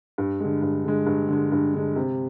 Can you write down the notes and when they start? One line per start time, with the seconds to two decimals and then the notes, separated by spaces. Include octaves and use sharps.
0.18 G2
0.40 D3 G#3
0.62 G2
0.85 D3 G#3
1.06 G2
1.28 D3 G#3
1.52 G2
1.74 D3 G#3
1.96 C3